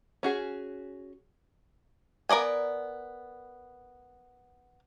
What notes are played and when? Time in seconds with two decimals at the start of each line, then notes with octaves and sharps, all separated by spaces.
0.23 C#4 F#4 G#4
2.29 B3 A#4 D5 D#5 G#5